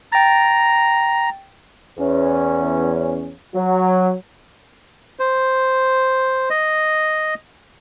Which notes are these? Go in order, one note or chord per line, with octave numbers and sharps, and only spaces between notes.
G5 A#5 A6
E2 C#4
F#3
C5
D#5